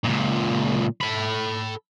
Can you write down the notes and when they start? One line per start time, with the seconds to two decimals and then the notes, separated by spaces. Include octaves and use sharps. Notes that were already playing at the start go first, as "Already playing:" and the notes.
0.05 C#2 A#2
1.01 A4 B5